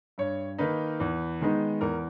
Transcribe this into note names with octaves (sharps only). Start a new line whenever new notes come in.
G2 C#5
D#3 A#3 D#4 B4
E2
D#3 G#3 B3 D#4
E2 A#4